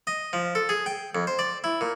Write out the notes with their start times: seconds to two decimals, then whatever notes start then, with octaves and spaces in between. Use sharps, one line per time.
0.07 D#5
0.33 F3
0.55 A4
0.69 G#4
0.86 G5
1.15 F2
1.27 C5
1.39 D5
1.64 E4
1.81 A#2